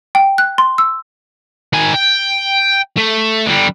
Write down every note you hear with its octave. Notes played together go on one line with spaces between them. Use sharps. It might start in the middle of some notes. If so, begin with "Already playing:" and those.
G5
F#6
C6
E6
D#3 G#5
G5
A3
D3 G3